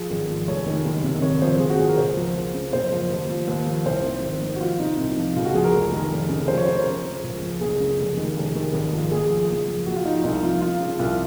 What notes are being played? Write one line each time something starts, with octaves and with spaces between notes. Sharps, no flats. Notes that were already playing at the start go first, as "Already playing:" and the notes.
Already playing: F3 G#4
G#1
F3
F1 C#5
D#3
F#1
C3
G#1 C#5
F3 C5
G#1 G#4
F#4
F3 G#4
A#4
C#2 C5
F3
F3
C#3
F#1 C5
F3
D#2
F3
D#2
F3
C2 C5
D#3
G#1
D#3
F#4
F3 F4
C3 D#4
C2
F3
C#2 F4
F#4
F3 G#4
A#4
F1
D#3
F1
C#3
F3 C5
C#5
C#3 C5
A#4
F3
C#3
C#2
F3
F#1 G#4
C#3
F1
D#3
F1
D#3
G#1
F3
A#1 G#4
F3
F#1
F3
A#1 F#4
F4
F3 D#4
F4
C2 D#4
F3 F4
F3 F4
C#3
C2 F4